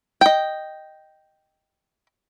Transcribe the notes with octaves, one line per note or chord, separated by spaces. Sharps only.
D#5 G5